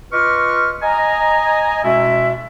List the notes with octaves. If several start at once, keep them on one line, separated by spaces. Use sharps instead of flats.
F4 B4 D#5 C#6 D6 F6
D#5 G#5 A#5
B2 G#3 C#4 E4 A4 E5